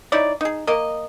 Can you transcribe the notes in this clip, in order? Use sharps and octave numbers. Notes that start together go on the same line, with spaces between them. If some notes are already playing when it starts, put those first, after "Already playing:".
D#4 E4 C#5 D5
D#4 G#4
A#3 A#4 D#5